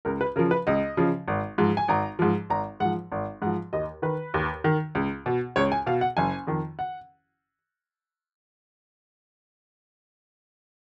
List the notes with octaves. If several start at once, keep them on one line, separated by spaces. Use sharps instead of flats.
C#2 A#4
B4
C#3 F3 A#4
B4
C#2 D#5
C#3 F3
G#1
G#2 F3
G#5
G#1 A#5
G#2 F3
G#1 A#5
G#2 F3 F#5
G#1
G#2 F3 F#5
D#2 D#5
D#3 B4
D#2
D#3
C#2
B2
C#2 C#5
G#5
B2 F5
F#5
F#1 G#5
F2 D#3
F#5